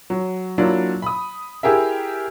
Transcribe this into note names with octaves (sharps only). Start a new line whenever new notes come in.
F#3
F#3 A#3 D4 E4 F4
B5 D#6
E4 G4 G#4 A#4 E5